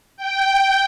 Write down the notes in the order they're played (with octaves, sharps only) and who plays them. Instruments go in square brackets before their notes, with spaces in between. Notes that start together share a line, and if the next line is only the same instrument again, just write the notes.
[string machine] G5